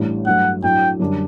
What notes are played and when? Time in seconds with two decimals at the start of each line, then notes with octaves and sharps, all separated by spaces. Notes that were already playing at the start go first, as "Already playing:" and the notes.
Already playing: A1 A2 G3 D4
0.26 G2 F#3 A3 F#5
0.63 A2 F#3 A3 D4 G5
1.00 F#2 D3 G3 D4